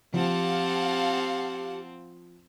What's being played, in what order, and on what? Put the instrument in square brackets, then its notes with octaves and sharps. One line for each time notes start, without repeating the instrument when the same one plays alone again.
[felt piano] F3 [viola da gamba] C4 [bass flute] G4 [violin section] F5 F#5 A5